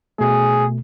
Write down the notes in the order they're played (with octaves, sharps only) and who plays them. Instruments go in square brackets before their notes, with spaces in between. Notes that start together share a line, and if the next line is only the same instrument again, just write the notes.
[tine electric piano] B2 A3 [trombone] G#4